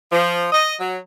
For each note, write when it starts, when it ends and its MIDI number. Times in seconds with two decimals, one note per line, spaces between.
0.12 0.46 53
0.52 0.74 75
0.80 0.97 54